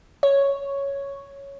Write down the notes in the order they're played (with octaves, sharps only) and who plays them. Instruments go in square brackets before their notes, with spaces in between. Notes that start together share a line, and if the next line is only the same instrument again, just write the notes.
[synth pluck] C#5